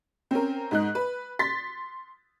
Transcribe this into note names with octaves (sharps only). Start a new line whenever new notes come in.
C4 C#4 A#4
G#2 D#4 F#6
B4
C6 A6 B6